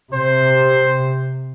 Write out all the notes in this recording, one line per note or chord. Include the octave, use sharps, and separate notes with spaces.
C3 C5